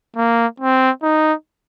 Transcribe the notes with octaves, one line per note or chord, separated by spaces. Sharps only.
A#3
C4
D#4